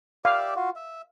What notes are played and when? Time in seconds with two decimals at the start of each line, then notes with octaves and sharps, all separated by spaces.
0.25 G4 D5 E5 F5
0.56 F4 F#4
0.76 E5